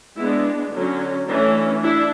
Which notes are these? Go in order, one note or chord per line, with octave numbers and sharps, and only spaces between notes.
G#3 B3 D4 E4
D3 F#3 C#4
E3 A3 C#4 D4
D4 E4